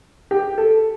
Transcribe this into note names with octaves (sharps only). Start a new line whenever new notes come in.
G4
A4